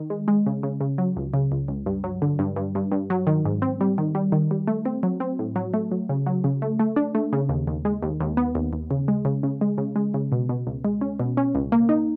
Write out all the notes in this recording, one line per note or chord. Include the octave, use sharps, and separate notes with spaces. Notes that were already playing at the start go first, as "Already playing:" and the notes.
Already playing: D#3
G#3
G#3
C#3
C#3
C#3
F#3
C#2
C#3
C#2
C#2
G2
F#3
D3
G2
G2
G2
G2
F#3
D#3
G#2
C4
G3
D#3
G3
D#3
G3
A3
C4
F#3
C4
A2
F#3
A3
F#3
C#3
F#3
C#3
A3
A3
D4
A3
C#3
D#2
D#2
G#3
D#2
D#2
B3
D#2
D#2
C#3
G#3
C#3
C#3
G#3
C#3
G#3
C#3
B2
B2
C#2
G#3
C#4
B2
C#4
C#2
A#3
D#4